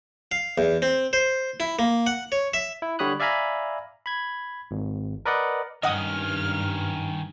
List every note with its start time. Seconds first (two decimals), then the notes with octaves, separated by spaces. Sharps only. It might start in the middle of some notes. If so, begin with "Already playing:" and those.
0.32 F5
0.58 E2
0.82 C4
1.13 C5
1.60 E4
1.79 A#3
2.07 F#5
2.32 C#5
2.54 E5
2.82 E4
2.99 D3 G3 C#5 B5 D#6 F#6
3.20 D5 E5 F5 G#5 A#5 B5
4.06 B5 G#6
4.71 G#1
5.26 A#4 B4 D5 D#5 F#5
5.83 G2 D#3 C#4 D#5 F#5 D#6 F6